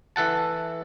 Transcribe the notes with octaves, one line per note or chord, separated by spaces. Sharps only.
E3 A4 F#5 A5